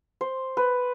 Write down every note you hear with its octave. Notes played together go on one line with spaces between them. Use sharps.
C5
B4